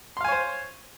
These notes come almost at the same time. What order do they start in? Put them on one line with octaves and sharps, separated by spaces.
C6 F5 G#5 C#5 C5